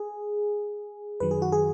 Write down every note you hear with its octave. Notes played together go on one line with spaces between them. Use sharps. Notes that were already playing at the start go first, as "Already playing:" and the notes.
Already playing: G#4
F#2 D#3 F#3 B4
G#4
F#4
G#4